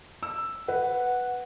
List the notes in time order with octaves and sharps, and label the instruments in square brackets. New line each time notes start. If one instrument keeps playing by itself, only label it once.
[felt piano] E6
[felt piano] B4 [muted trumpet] F#5